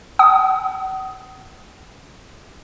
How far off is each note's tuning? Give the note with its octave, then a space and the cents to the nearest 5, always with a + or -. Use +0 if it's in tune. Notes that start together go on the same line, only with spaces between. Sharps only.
F#5 +45 D#6 +10